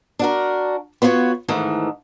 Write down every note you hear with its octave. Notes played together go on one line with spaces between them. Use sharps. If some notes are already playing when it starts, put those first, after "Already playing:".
D4 F#4 A#4
B3 F4 F#4 B4 C#5
G#2 D#3 E3 A3